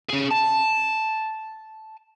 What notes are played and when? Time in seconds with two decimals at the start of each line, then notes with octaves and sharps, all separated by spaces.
0.09 C#4 G#4
0.31 A5